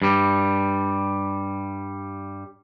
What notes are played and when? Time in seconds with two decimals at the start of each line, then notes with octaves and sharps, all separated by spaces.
0.02 G2 G3